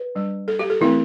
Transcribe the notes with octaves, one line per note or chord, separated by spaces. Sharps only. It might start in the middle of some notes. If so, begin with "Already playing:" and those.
Already playing: B4
G3 D4
A4
G4
A4
E3 A3 C4 E4